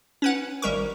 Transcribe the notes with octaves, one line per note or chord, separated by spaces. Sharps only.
C#4 B4 F#5
G#1 G3 A#4 C#6